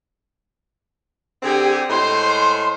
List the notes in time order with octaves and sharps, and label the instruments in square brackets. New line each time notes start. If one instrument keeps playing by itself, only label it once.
[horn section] D3 C4 G#4 [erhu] G4
[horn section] A2 G#3 C5 [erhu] C6